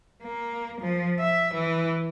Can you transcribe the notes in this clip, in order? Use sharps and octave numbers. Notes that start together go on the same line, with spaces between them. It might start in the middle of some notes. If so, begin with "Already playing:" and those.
A#3
F3
E5
E3